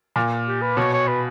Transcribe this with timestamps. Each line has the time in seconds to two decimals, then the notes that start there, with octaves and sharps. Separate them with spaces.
0.16 A#2
0.46 G4
0.62 B4
0.77 B2 C#5
0.93 C#5
1.08 B4